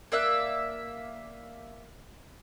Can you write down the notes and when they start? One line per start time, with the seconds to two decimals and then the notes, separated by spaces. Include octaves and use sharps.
0.12 A#3 D5 E5 F#6